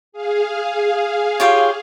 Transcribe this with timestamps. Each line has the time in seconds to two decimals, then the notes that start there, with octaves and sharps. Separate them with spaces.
0.12 G#4 F5
1.40 F4 G4 C#5